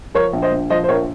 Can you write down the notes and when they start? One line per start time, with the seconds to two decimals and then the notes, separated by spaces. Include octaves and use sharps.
0.15 F3 A#4 C#5
0.33 A#1
0.42 C5 D#5
0.52 A#1
0.70 F3 C5 D#5
0.84 C5
0.88 A#1 A#4 C#5